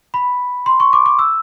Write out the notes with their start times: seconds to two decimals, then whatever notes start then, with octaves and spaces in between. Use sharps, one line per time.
0.14 B5
0.66 C6
0.80 C#6
0.93 D6
1.06 D6
1.19 E6